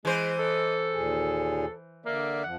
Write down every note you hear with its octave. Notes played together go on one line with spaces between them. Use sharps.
E3 G#3 C5
A4 D#5
D#2 A#2 G#4
D3 A#3 D5 E5
F2 F3 F#5